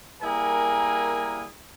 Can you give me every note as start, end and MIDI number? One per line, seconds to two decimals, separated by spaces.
0.22 1.45 55
0.22 1.45 58
0.22 1.45 64
0.22 1.45 68
0.22 1.45 70
0.22 1.45 80